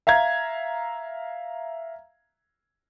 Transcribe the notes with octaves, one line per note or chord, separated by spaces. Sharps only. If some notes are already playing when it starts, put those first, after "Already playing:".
E5 F5 A#5 G#6